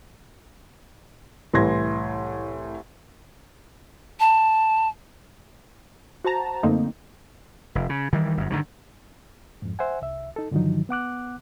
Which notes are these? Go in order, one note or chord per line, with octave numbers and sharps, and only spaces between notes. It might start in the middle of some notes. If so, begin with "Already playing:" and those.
C2 A2 E3 C6 G#6 A#6
A5
F#4 C5 A5 A#5
F#2 D3 A3 A#3 C4 D#4
F1
C#3
D#3 E3 G3
G1 F#2
G2 D3 D#3 F3
F2 G#2
C5 E5 F#5 G#5
C2 E5
D#4 A4
G2 D3 D#3 F3 F#3 D#4
B3 F#5 D6 F#6